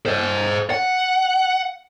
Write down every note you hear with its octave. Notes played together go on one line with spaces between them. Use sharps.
C5 D#5
F#5